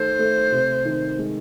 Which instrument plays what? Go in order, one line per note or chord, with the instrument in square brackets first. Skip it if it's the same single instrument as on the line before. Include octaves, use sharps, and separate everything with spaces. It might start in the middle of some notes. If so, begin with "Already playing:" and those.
Already playing: [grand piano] D#3 A3 A4 [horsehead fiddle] C5
[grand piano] A3
C3
D#3
G#3